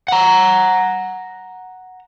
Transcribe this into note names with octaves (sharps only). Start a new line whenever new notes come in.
F#5 A#5